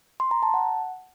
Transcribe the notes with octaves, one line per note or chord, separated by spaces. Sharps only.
C6
A#5
A5
F#5